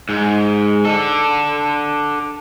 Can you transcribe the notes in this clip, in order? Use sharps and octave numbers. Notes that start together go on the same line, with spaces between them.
G#2
D4 A4